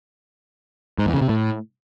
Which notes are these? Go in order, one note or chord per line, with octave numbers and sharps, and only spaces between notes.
G#2
E2
C#3
C3
A2